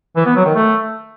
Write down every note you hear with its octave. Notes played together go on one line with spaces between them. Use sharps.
E3
B3
F#3
D#3
A3